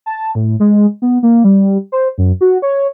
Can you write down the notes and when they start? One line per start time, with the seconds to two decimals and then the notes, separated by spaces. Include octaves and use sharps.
0.06 A5
0.35 A2
0.60 G#3
1.02 B3
1.23 A#3
1.44 G3
1.92 C5
2.18 F#2
2.41 F#4
2.62 C#5